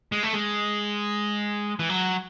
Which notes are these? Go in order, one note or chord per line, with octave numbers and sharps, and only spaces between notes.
G#3
A3
G#3
E3
F#3